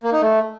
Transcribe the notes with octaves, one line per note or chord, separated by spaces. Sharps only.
A#3
D#4
A3